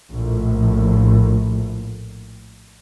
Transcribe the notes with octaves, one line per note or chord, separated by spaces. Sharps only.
A#1 A2